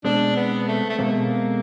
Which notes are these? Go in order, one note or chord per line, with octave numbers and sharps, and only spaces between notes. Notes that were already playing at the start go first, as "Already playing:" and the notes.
B2 G#3 C4 D4
B3
A3
A3
B2 G#3 A#3 C4